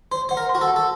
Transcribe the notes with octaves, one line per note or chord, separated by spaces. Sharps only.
C5 C6
C5 F#5
A#4
C6
F#4
A4
F#5
A4